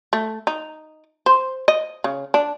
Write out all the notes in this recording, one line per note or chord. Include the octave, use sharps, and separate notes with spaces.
A3
D#4
C5
D#5
C#3
D4